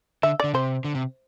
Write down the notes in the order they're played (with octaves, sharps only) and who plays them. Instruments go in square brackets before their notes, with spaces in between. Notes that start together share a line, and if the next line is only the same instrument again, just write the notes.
[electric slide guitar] D3 [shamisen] E5
[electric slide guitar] D3 [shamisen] D5
[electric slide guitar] C3 [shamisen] C5
[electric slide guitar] D3
C3